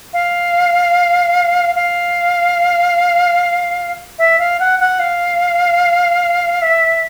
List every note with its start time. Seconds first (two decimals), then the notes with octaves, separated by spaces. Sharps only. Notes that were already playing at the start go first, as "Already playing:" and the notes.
0.14 F5
1.76 F5
4.19 E5
4.39 F5
4.60 F#5
4.80 F#5
4.99 F5
6.62 E5